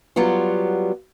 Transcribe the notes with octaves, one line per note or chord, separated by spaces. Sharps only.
F#3 G3 B3 F4